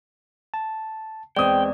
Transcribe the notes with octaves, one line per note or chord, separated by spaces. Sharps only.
A5
E2 G#3 C4 D5 G5 D#6